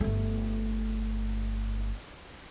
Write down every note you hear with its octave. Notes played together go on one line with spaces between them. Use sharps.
G1 A3